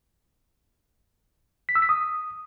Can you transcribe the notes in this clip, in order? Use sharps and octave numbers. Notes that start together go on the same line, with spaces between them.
B6
E6
B6
D#6